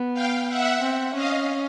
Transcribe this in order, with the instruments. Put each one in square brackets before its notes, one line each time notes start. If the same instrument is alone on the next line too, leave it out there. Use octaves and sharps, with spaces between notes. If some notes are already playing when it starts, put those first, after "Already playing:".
Already playing: [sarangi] B3
[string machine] F5 G5
E5 F#5
[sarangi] C4
[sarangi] C#4 [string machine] D#5 F5